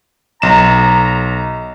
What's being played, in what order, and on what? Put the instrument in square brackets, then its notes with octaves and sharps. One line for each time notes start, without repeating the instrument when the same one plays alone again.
[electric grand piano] B1 E7 [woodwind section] A#5